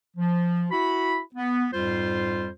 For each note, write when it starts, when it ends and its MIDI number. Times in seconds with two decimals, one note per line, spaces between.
0.17 0.67 53
0.71 1.19 64
0.71 1.19 66
0.71 1.19 83
1.35 1.66 59
1.73 2.49 41
1.73 2.49 44
1.73 2.49 55
1.73 2.49 65
1.73 2.49 72